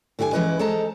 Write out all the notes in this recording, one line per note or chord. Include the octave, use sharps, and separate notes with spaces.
D3 E4 G4 F5 G#5
E3 G#3 C#4 E4 B4 D#5
G#3 A4 C5 D#5 A5 A#5